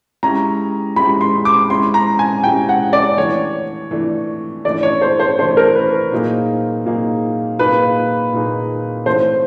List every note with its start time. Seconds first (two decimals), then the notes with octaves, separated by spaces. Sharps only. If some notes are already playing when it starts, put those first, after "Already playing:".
0.23 G#3 C#4 E4 G4 A#5
0.96 G#3 C#4 E4 G4 B5
1.21 C6
1.45 D6
1.70 G#3 C#4 E4 G4 C6
1.94 A#5
2.19 G#5
2.44 G#3 C#4 E4 G4 G5
2.69 F#5
2.93 D5
3.17 E3 A3 D4 C#5
3.91 E3 A3 D4
4.65 E3 A3 D4 D5
4.83 C#5
5.02 C5
5.20 C5
5.39 E3 A3 D4 C5
5.57 A#4
5.75 B4
6.12 A#2 F#3 A#3 D#4 G#4
6.85 A#2 F#3 A#3 D#4 G#4
7.59 A#2 F#3 A#3 D#4 G#4 B4
8.32 A#2 F#3 A#3 D#4 G#4
9.06 E3 A3 C4 C5